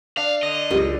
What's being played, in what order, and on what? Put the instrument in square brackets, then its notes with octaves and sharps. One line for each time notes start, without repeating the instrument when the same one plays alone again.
[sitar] D4 [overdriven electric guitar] F5
[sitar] D3 [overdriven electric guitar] D#5
[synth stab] C#2 F#2 [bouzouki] G3